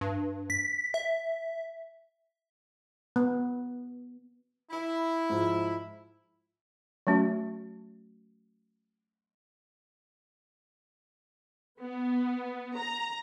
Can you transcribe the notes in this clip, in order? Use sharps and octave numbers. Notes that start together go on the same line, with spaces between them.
G2
B6
E5
B3
E4
G#2 F3
F#3 A3 C#4 F#4
B3
A#5